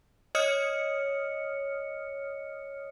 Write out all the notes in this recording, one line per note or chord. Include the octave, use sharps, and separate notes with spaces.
C#5 D#5 D#6 F6 C#7